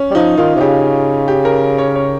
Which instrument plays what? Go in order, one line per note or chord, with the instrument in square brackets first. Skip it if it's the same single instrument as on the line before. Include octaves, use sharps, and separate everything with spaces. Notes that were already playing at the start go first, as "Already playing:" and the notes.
Already playing: [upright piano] C#4
[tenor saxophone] G3
[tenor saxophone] F3 [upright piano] D#4
[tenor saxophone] D#3 [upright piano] F4
[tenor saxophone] C3
[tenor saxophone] C#3 [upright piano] G4
[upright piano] G4
A#4
C#5
C#5